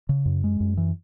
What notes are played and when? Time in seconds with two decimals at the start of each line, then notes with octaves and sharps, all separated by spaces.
0.09 C#3
0.26 F#2
0.44 G#3
0.60 F#2
0.77 E3